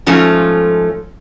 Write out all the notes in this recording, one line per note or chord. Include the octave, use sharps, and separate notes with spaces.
G#2 F3 A3 C#4 F4